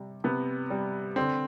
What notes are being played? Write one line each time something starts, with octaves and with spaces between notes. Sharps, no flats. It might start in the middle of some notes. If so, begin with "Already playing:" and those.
Already playing: C3 G3
C3 B3
G3
D3 C4